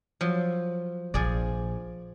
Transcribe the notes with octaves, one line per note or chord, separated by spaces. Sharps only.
F3 F#3
A#1 F3 G#4 D5